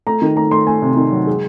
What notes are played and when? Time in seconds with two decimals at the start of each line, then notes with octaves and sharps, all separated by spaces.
0.07 A3 A#5
0.22 D#3
0.37 A3 A#5
0.51 A3 C6
0.67 A3 G#5
0.82 C3
0.97 D#3
1.12 F#3
1.27 G#3